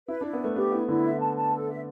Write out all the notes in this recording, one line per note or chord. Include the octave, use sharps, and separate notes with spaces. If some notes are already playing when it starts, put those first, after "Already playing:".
E4 B4
D4
E4
B3
A3 B4
B3 G4
B3 E4
D3 E4
E5
A5
A5
A4
E5